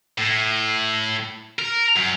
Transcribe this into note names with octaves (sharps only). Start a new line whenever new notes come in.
A2
A#4
F#2